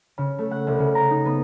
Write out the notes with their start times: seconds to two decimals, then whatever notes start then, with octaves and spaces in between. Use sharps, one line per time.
0.18 C#3
0.38 A3
0.51 F#5
0.67 C2
0.79 C#3
0.95 A#5
1.10 D#4
1.25 B3